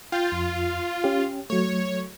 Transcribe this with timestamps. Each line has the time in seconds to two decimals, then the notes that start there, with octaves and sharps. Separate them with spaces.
0.12 F4 G5 G6 A6
0.32 F2
1.04 C#4 G4
1.50 F#3 A3 C#5